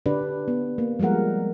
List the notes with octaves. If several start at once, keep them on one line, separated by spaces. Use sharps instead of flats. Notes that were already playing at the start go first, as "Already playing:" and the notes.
D3 D4 G4 B4 D5
B3
A#3
F3 G3 G#3 A#4 F#5